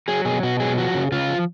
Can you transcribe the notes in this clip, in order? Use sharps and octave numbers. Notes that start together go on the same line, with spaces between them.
F#3 G#4
B2 G#4
B2 F#4
F#3 G#4
F3 F#4
C#3
C#3 F4
F3